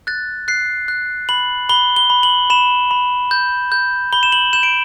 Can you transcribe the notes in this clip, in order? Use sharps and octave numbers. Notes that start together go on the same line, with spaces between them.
F#6 A6
F#6 C7
F#6
B5 F#7
B5 G7
G7
B5
F#7
B5 E7
B5
G6
G6
B5 G7
E7
F#7
G6 E7
D7